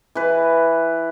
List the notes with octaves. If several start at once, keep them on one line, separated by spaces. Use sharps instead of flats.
E3 B4